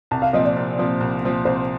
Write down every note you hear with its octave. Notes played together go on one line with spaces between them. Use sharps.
C2 A5
F5
A#2 F3 C4 D#5
D5
C2
A#2 F3 C4
C2
A#2 F3 C4
C2 C5